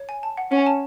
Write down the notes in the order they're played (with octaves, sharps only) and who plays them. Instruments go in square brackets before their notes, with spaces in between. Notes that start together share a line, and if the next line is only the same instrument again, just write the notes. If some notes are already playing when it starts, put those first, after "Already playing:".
Already playing: [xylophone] C#5
G#5
A5
F#5
[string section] C#4 [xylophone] F#5
[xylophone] A5